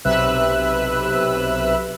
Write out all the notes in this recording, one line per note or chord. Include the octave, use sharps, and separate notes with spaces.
B1 C3 B4 E5 E6 F#6